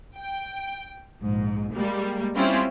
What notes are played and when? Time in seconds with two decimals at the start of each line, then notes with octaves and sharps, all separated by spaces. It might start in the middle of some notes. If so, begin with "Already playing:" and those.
0.17 G5
1.21 A#1 G#2
1.73 G3 G#3 A#3
2.35 G3 C4 C#4 E4 F4 G4